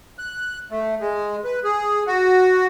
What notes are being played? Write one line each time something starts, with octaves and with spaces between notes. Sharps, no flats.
F#6
A3
G#3
B4
G#4
F#4